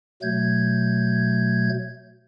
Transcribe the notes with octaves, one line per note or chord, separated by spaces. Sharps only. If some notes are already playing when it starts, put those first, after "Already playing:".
B2 F#3 A3 G6 G#6